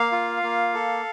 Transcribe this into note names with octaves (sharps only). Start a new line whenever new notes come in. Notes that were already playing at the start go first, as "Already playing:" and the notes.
Already playing: A#3 F5
F4
A#3
A4